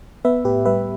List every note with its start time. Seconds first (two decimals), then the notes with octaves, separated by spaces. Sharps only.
0.25 B3 B4 E5
0.45 A2 G4 B4
0.65 G3 B4 E5